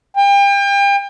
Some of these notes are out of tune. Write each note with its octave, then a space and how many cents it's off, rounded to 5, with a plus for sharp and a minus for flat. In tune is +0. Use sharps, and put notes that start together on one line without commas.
G5 +35